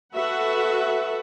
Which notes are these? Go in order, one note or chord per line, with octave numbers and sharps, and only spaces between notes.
F#4 A4 B4 E5 F#5